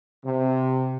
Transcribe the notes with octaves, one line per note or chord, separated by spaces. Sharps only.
C3